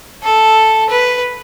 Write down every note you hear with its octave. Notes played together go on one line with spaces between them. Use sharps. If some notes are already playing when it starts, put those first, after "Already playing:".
A4
B4